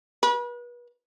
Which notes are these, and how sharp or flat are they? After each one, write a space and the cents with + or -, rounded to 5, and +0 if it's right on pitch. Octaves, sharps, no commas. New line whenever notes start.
B4 -35